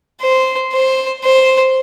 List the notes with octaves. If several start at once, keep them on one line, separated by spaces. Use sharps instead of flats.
C5
C5
C5